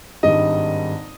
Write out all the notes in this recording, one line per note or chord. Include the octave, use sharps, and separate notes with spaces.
G#1 G2 D#3 G3 D#5